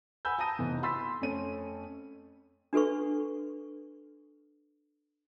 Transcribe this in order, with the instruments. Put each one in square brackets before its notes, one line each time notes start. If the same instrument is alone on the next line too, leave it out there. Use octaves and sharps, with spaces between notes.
[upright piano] F#5 G#5 B5 E6 G6
A5 A#5 D#6 A#6 D#7
F1 E3 B3
B5 C6 E6 A6 B6
F2 A3 C4 C#4 C#5 D#7
[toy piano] D4 F#4 A4 B4 C#6